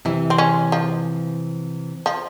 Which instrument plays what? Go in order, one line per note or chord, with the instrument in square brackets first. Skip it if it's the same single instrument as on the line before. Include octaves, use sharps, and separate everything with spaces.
[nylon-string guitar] C3 E3 [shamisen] E4
[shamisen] C4
C#4
F3
F3